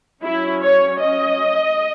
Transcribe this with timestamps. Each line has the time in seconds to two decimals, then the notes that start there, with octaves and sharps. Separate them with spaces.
0.23 F#3 C#4 E4
0.63 C#5
1.02 D#5